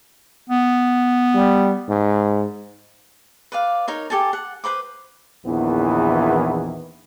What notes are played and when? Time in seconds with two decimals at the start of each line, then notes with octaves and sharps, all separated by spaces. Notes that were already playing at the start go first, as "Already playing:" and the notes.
0.50 B3
1.36 G3
1.89 G#2
3.52 B4 D5 F5
3.88 D#4 A#4 C#5
4.10 G4 A4 G#5 A5
4.33 F#5
4.64 B4 C5 B5 D6
5.46 A#1 E2 D#3 E3 B3